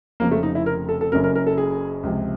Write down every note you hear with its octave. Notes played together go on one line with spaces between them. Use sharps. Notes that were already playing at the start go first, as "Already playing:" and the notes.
F1 F2 C#3 F3 A#3
A3
D#4
E4
A#4
A4
A4
F#1 F#2 C#3 A#4
A#4
A#4
A4
G#4
C#2 C3 F3